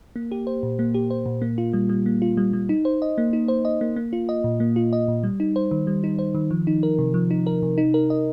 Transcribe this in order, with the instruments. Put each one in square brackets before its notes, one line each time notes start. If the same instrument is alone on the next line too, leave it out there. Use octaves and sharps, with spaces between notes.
[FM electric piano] A#3
G4
C5
A#2
A#3
G4
C5
A#2
A#3
F4
G3
G3
A#3
F4
G3
G3
D#4
C5
D#5
A#3
D#4
C5
D#5
A#3
A#3
F4
D#5
A#2
A#3
F4
D#5
A#2
G3
D#4
C5
D#3
G3
D#4
C5
D#3
F3
D#4
A#4
C3
F3
D#4
A#4
C3
D#4
A#4
D#5